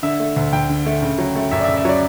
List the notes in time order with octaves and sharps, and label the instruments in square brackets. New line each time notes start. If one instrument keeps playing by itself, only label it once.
[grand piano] D3 E5
A3
D2
D2 G5
D3
A3
C#3
F#3
A3
F#2 E5
D5
E5
C#3
E5
F#3 C#5
D5